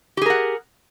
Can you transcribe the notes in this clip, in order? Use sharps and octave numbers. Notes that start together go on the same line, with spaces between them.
G4 G#4 A#4 F#5